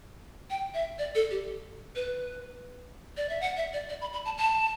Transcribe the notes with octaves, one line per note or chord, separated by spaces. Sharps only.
G5
E5
D5
A4
G4
B4
D5
E5
F#5
E5
D5
D5
B5
B5
A5
A5